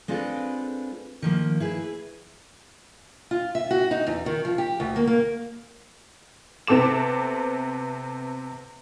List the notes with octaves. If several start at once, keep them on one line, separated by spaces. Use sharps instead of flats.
G#3 C4 D4 F4 A4 B4
D#3 F3 A#3
E4 G#4 B4
F4
E5
F#4
D#4
E2
D#3
F3
G4
D2
A#3
A#3
C3 B3 C4 A4 D6 E7